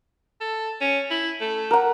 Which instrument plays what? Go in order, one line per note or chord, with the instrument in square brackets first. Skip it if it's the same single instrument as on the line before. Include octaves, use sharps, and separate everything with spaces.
[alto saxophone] A4
C#4
E4
A3
[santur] A#4 F#5